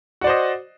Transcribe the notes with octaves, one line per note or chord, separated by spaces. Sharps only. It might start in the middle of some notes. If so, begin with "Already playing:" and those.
F#4 C5 D5 D#5